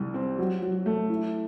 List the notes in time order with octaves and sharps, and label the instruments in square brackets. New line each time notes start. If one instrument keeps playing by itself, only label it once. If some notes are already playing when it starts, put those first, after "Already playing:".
Already playing: [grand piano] C2 G3
C4
F#3
F#3
A3
E4